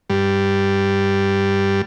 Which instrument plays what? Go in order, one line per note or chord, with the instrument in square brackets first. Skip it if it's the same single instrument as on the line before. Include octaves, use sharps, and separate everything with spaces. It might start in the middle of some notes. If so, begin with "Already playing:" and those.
[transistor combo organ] G2 G3